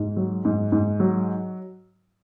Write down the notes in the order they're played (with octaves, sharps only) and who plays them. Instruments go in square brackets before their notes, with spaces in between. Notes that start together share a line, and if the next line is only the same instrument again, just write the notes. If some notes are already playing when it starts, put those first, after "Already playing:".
Already playing: [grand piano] G#2
F#3
G#2
G#2
F#3